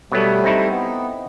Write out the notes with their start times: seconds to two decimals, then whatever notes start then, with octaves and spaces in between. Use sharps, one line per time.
0.12 B2 F#3 G3 A3 B3
0.44 C4 D#4 E4
0.70 B3